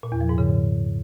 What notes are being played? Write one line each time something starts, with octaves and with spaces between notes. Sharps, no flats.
A#2
E2
F3
G#2
C#3